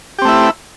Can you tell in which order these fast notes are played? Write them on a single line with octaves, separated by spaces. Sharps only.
G4 C4 A3 E4